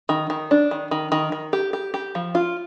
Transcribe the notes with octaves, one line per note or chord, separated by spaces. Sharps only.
D#3
D#3
D4
D#3
D#3
D#3
D#3
G4
G4
G4
F3
F4